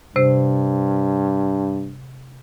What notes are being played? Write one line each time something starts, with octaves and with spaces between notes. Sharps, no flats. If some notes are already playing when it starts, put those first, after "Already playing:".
G2 C3 C5